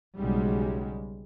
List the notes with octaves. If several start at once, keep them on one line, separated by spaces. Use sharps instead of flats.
B1 C#3 G3 G#3